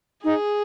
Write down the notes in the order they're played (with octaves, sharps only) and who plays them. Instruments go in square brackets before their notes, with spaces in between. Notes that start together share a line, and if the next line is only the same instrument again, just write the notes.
[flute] D#4 [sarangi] G#4